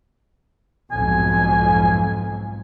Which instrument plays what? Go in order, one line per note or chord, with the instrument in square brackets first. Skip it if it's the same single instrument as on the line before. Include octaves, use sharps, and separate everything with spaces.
[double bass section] B1 F2 G#2 [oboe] G#5